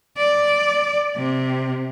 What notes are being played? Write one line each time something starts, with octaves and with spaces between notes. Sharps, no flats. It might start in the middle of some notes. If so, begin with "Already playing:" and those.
D5
C3